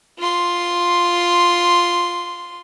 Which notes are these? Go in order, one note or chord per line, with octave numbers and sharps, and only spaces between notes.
F4 C6